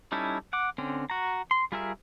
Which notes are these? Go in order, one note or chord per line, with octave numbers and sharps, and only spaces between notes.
G3 C#4 D#4 E4 A4
F#5 D6
D3 C4 C#4
F#4 A#5
C6
G3 F4 G#4 A#4 E5